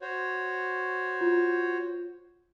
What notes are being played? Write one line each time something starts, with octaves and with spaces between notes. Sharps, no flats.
F#4 C5 C#5
F4